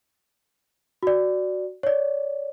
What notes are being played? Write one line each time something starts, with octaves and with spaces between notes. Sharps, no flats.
F#4 D5
C#5 D5